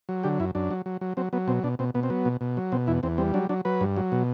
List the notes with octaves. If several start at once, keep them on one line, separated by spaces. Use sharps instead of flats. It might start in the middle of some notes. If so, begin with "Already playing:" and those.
F#3
D3 G4
F#2 E4
F#2 D4
F#3
F#3
F#3
F#3 C4
F#3 B3
B2 C4
B2 D4
B2 C4
B2 B3
C4
F#3 B3
B2
B2
F#3
B2 C4
E2 E4
E2 C4
G3 C4
F#3 D4
F#3 D4
F#3 B4
G2
F#3
B2